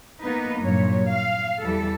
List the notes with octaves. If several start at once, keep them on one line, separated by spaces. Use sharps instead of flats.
A#3 B3 D#4 B4
G2 A#2 F#3 C#5
F5
E2 E3 G3 A4